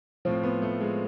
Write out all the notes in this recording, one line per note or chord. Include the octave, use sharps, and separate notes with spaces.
A2 F3 C4
B3
A3
G#3